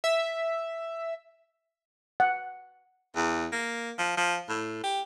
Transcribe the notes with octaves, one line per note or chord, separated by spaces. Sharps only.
E5
F#5
E2
A#3
F3
F3
A2
G4